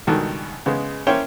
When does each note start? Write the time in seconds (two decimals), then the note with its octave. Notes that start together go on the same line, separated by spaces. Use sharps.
0.07 C#2 G2 B2 D#3 A4
0.66 C#3 G#3 B3
1.07 A#3 C#4 E4 C5 C#5 G5